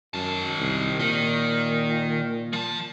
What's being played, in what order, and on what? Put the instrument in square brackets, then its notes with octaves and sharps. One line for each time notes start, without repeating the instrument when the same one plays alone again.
[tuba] F#2 [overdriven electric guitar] D#3 A5
[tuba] C2
[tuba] A#2 [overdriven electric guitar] D#3
[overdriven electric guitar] F3 A5